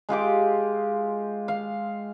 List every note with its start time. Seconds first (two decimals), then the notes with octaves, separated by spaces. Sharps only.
0.09 G#3 F4 G4 D6
1.48 F5